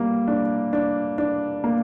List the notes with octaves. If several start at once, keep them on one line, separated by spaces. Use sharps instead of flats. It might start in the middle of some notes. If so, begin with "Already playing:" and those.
Already playing: G3 A#3
D4
D4
D4
A#3